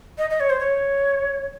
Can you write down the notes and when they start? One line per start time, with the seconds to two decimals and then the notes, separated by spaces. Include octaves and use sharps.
0.18 D#5
0.30 D#5
0.40 C#5
0.50 C5
0.60 C#5